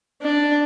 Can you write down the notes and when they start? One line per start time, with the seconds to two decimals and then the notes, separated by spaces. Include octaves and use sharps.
0.22 D4